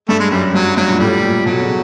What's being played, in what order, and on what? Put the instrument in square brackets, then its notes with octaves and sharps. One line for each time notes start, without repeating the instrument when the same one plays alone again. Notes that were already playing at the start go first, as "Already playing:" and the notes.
[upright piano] G2 [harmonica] A3
[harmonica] G#3
[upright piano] F#2 [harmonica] G3
[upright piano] G2 [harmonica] F#3
[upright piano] G2 [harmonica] F#3
[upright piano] A#2
[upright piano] A2 [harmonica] G3
[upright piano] A#2
[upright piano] B2 [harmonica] F#3
[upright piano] C#3